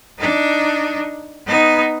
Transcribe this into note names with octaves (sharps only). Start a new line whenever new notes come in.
D4 D#4
B3 D#4